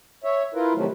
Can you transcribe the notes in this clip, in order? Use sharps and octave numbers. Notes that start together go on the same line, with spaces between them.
C#5 E5
E4 F4 A#4 B4
C3 D#3 F3 F#3 A3